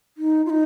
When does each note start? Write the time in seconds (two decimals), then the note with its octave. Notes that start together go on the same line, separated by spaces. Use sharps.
0.18 D#4
0.46 F4
0.50 D#4